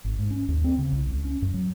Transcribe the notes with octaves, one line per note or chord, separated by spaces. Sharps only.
G#1
G#2
C#4
D#2
C4
C#3
C2
C#2
C#4
F#2
F#3